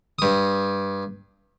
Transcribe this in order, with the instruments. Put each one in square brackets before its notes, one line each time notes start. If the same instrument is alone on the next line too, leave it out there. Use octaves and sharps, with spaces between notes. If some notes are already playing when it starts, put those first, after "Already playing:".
[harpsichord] G2 D#6